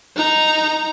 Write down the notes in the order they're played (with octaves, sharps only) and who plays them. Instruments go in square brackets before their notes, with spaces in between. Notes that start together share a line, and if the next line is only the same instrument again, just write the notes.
[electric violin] D#4 A#5